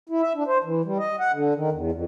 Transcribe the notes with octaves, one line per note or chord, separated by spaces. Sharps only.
E4
E5
D4
C5
E3
G3
D#5
F#5
D3
D#3
E2
F2